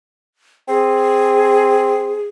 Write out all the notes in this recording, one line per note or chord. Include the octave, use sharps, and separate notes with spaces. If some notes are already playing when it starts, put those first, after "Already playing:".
C4 G#4